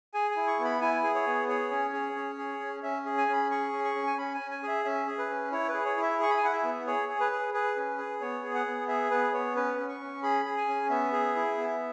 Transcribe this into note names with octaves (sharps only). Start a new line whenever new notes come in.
G#4 G#5
G#5
E4
C#6
B3
B5
E4 G#5
G#4
C#5
B3
G#4 C#5
C#4
G#4
C#4
G#4
C#4
C#4 E5
G#4
G#5
C#4 B5
G#4 C#6
C#4
C#6
C#4
G#5
C#4 B5
G#5
C#4
G#5
G#4
E5
C#4 E5
G#4
B4
C#4
E4 C#5
B4
G#4
C#5
E4
E5
G#4 C#6
B5
G#5
E4 F#5
E5
B3
G#4 C#5
G#4
B4
G#4
G#4 B4
C#4
G#4
B3 C#5
G#4
F#5
B3
G#4 E5
B3 B4
B3 C#5
C#4 B4
C#4
C#6
C#4
G#4 B5
G#4
G#5
C#4
B3 E5
G#4
E4
B3